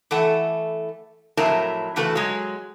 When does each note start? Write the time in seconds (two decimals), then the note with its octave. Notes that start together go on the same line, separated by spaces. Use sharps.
0.11 E3 A3 A4 F#5
1.37 F2 A2 F#3 A#4 E5 A5
1.96 C#3 E3 A3 F#4 A4 B4
2.15 F#3 G#3